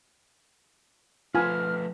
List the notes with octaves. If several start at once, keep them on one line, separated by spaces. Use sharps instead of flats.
F3 A3 F4 B4 G#5 F6